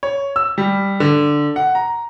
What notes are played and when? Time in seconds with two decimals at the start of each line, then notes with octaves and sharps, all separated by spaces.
0.03 C#5
0.36 E6
0.58 G3
1.00 D3
1.56 F#5
1.75 A#5